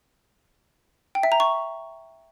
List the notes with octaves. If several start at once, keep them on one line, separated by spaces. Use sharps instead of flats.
G5
E5
A#5
C#6